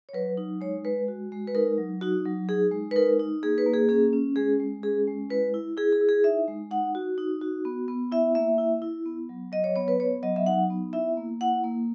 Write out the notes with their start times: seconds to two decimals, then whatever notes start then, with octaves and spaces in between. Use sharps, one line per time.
0.09 C#5
0.13 F#3 B4
0.37 D#4
0.61 G#3 C#5
0.85 G#3 B4
1.08 F#4
1.32 G#3
1.48 B4
1.55 D#4 A#4
1.78 F#3
2.01 D#4 F#4
2.25 F#3
2.49 D#4 G#4
2.72 G#3
2.91 B4
2.96 D#4 A#4
3.19 D#4
3.43 A#3 G#4
3.58 B4
3.66 A#3
3.74 G#4
3.89 C#4 G#4
4.13 C#4
4.36 G#3 G#4
4.60 G#3
4.83 C#4 G#4
5.07 G#3
5.30 E4 B4
5.54 E4
5.77 E4 G#4
5.92 G#4
6.01 E4
6.09 G#4
6.24 D#4 E5
6.48 G#3
6.71 D#4 F#5
6.95 F#4
7.18 D#4
7.41 F#4
7.65 B3
7.88 B3
8.12 E4 E5
8.35 A#3 E5
8.58 E4
8.82 E4
9.06 B3
9.29 F#3
9.52 F#3 D#5
9.64 C#5
9.76 B3 C#5
9.88 B4
10.00 B3 C#5
10.23 F#3 D#5
10.36 E5
10.46 D#4 F#5
10.70 B3
10.93 E4 E5
11.17 A#3
11.41 E4 F#5
11.64 A#3